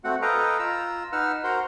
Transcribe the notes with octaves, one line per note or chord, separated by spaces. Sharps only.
A3 C4 F#4 F#5
A4 B4 D#5 F5 G5 A#5
F4 A#5 E6
D#4 B4 F#5 E6 F6
F#4 A#4 C5 F#5 A#5 C6